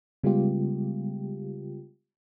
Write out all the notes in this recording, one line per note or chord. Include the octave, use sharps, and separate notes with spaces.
C#3 G3 G#3 B3 F4 G4